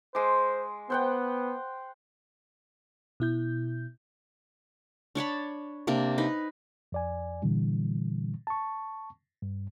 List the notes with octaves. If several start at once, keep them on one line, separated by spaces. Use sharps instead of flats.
G#3 C5 D6
B3 C5 F#5 G5
B2 E4 G6
D4 C#5 A5 B5
C3 A#3 D4
D#4 B4
F2 D5 G#5
A#2 D3 E3 G3
A5 C#6
G2